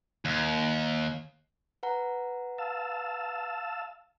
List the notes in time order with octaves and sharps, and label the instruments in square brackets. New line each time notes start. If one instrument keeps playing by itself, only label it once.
[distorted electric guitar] D#2
[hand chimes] B4 F#5 A#5
[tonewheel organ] F5 A5 E6